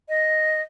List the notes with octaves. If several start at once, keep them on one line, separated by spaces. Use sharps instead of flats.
D#5